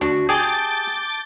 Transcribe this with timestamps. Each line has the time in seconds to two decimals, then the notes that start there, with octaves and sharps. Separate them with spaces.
0.01 D2 D4 F#4
0.29 G4 G#4 A5 D6 G6 A6